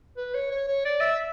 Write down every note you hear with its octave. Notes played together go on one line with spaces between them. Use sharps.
B4
C#5
C#5
C#5
D5
E5